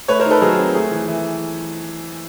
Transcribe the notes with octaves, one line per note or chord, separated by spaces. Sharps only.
A3 B4 C#5
A#4 C5
D#4
A4 B4
F#3 G#4 A#4
C4
A3 G#4
E3
E3